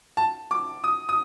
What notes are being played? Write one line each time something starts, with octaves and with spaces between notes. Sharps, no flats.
A5
D6
D#6
D#6